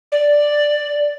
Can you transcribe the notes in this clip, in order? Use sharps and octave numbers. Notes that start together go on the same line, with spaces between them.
D5